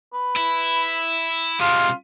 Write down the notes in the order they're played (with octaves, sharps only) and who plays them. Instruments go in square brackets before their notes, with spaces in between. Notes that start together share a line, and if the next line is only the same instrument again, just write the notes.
[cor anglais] B4
[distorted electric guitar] E4
[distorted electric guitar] C3 G#3 [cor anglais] F4